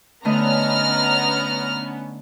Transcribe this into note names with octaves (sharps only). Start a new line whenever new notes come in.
D3 A3 B3 C#4 D#5 A#5 F6